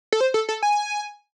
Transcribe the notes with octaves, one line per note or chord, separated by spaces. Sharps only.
A4
C5
A4
A4
G#5